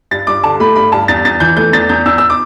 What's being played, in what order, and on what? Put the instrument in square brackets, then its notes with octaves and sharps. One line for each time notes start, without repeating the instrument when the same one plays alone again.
[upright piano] G2 A6
G2 D6
D3 A5
A3 B5
G2 B5
G2 A5
E2 A6
E2 A6
E3 G6
A3 G6
E2 A6
E2 G6
E2 E6
E6
D6